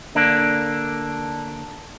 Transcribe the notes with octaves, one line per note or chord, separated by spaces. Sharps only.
D3 A#3 D4